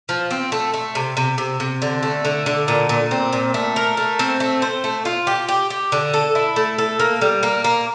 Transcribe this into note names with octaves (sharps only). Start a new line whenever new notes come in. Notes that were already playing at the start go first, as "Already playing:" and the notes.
F3
C4
A3
A3
C3
C3
C3
C3
D3
A3
D3
D3
A#2
A#2
C4
A#2
A3
A#4
A3
C4
A3
C5
A3
F4
G4
G4
G4
D3
A4
E4
A3
A4
A#3
G3
A#3
A#3